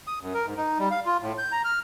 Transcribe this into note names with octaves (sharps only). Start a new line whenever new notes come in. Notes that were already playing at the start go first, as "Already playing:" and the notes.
D#6
F#2
A#4
G#2
D#4
G3
F5
F4
A2
G6
A#5
F6